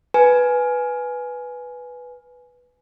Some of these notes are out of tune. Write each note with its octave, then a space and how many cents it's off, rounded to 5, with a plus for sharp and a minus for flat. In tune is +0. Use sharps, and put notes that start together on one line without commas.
B4 +0 G#5 +10